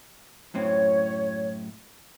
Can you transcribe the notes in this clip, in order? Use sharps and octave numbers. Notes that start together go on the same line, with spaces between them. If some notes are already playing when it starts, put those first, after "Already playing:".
F#2 A2 C4 C#5